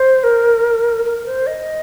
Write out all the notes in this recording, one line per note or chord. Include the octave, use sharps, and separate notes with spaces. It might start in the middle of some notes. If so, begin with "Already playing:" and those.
Already playing: C5
A#4
A#4
C5
D#5